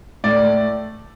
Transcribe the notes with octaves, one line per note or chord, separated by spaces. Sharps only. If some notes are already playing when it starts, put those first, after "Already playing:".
A2 D5
A3